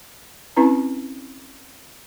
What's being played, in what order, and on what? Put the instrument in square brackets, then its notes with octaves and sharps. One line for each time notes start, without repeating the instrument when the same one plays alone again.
[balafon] C4 C#4 E4 B4 A#5